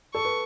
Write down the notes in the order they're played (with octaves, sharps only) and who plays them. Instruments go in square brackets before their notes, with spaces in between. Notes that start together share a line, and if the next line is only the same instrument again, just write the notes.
[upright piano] A4 [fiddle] C#6
[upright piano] B4